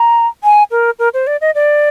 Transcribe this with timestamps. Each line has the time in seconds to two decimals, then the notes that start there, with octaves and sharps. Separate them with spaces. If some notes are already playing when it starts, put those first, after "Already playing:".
Already playing: A#5
0.44 G#5
0.71 A#4
0.99 A#4
1.14 C5
1.27 D5
1.41 D#5
1.55 D5